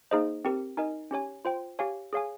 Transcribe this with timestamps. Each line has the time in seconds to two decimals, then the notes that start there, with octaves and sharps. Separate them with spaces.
0.11 A#3 D#4 G#4 C5 D#5
0.45 C4 G4 A#4
0.77 D#4 A#4 D#5 G#5
1.11 C#4 G4 C#5 G#5
1.45 F4 C5 G5
1.79 G4 C#5 F5 G#5
2.13 G#4 C#5 F5 G#5